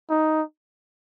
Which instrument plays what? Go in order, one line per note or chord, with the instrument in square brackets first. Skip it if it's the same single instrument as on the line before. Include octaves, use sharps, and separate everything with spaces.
[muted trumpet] D#4